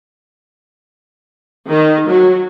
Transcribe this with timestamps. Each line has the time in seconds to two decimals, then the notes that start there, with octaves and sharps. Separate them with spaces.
1.69 D#3
2.08 F#3